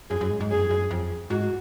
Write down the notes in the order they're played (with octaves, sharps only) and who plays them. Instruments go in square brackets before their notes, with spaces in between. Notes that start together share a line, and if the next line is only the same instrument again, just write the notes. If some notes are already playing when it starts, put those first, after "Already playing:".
[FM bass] F#2 [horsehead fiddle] G#4
[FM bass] F#2
G#2
G#2
[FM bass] F#2 [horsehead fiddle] G#4
[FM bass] F#2
F2
[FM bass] G#2 [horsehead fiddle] F#4